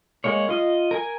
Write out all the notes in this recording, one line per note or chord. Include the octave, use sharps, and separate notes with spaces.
G#3 A#3 C#5
F4 D#5
A#4 G#5